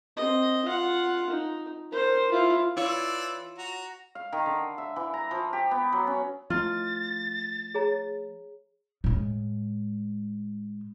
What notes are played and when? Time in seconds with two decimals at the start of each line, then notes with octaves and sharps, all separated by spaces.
0.17 C4 D#5
0.65 F4 F#5
1.30 D#4
1.91 A#4 C5
2.31 E4 F4
2.77 E3 E4 F4 C#5 D5 E6
3.59 F#4 A#5
4.15 F5
4.32 D#3
4.46 D3
4.78 E5
4.96 E3
5.14 A#5
5.31 F3
5.53 G4
5.71 B3
5.92 F#3
6.07 C#4
6.50 F3 A3 E4 F4 D#5 A6
7.75 G#4 C#5 A#5
9.04 A2 G#3